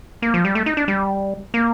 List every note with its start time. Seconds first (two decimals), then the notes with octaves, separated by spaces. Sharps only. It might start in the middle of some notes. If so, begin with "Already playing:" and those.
0.22 A#3
0.34 F3
0.45 G3
0.55 A3
0.66 D#4
0.77 D4
0.88 G3
1.54 A#3